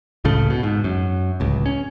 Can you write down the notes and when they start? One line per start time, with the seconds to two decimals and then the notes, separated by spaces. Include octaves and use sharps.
0.25 C#2 A2 C#3 A3
0.50 B2
0.63 G#2
0.84 F#2
1.40 D1 C#2
1.66 C#4